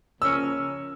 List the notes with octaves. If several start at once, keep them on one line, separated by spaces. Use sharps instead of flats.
C#3 F3 A#3 C#4 E6